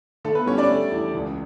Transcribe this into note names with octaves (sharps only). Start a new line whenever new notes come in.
D3 A3 A4
B3 B4
G3 C#4 C#5
D4 D5
A3
E2
C#2